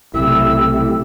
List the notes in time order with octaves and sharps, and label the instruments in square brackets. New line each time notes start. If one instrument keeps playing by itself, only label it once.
[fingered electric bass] B1 C3 [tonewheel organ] A3 G4 [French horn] E4 [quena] E6